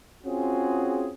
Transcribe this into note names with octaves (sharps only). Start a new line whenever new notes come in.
C4 C#4 F4 F#4 G#4